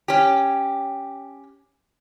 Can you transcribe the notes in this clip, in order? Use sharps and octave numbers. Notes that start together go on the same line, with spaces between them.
C#4 G4